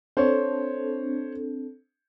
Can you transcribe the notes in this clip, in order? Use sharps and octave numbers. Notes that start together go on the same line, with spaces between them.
C4 D4 A4 C5 C#5